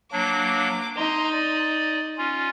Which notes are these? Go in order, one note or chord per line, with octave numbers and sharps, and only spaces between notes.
F#3 A#3 D4 D6
D#4 A#5 C6
D5
C#4 F4